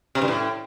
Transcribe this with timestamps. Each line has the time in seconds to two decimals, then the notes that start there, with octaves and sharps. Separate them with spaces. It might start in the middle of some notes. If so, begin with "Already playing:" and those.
0.15 C3
0.22 G2
0.28 A2